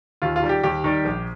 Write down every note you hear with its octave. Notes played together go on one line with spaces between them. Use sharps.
D#2 F4
F4
D#3 G3
G4
D#2 G4
D#3 G3
A#1